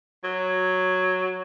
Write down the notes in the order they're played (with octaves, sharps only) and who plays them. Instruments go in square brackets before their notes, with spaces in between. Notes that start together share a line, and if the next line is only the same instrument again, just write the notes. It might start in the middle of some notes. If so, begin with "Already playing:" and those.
[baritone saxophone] F#3